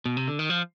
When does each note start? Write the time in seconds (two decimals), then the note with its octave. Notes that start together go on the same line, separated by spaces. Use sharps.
0.06 B2
0.17 C3
0.28 D3
0.39 D#3
0.50 F3